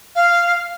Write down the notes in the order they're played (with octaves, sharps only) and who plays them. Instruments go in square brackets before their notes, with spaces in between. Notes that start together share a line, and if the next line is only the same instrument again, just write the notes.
[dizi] F5